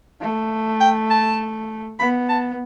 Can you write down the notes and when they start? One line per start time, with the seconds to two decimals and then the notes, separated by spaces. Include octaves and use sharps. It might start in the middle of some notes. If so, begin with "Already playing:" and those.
0.21 A3
0.80 G5
1.10 A5
1.99 B3 B5
2.29 A5